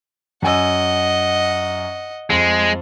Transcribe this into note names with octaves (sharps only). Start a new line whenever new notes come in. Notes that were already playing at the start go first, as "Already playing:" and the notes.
F#2 D#5 F#5 G#5 E6
F2 G#3